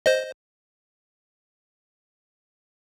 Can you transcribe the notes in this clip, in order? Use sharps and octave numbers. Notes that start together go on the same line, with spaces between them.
C5 D#5